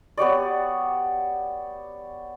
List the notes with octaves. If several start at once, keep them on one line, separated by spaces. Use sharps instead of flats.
B3 G4 C#5 D5